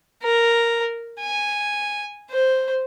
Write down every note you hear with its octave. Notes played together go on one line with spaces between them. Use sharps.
A#4
G#5
C5